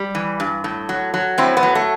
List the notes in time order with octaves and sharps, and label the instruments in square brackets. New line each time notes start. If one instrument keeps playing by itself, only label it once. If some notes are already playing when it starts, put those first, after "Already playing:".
Already playing: [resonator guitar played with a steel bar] G3
E3
G2
A2
F#3
F#3
A2 C4 E4
B3
F#3
A3